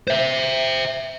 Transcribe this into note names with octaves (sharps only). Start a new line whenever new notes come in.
C5 E5